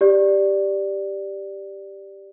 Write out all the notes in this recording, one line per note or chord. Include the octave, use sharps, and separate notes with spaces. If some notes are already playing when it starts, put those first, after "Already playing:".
G4 D5